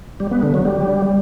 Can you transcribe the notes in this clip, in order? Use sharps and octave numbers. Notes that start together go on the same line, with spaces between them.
G3
B3
D3
F#3
G3